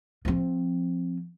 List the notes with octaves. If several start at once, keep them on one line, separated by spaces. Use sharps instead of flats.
F3 C4